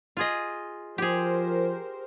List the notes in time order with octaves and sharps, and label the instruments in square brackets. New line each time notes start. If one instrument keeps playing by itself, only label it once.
[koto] F4 G#4 D#5
[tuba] F3 [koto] G4 G#4 [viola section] A#4 C5